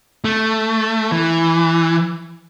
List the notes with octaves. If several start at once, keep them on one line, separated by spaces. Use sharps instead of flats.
A3
E3